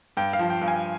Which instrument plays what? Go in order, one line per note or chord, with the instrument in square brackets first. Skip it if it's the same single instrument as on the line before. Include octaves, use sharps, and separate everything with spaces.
[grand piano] G2 G5
F5
F3
G5
G2
G#5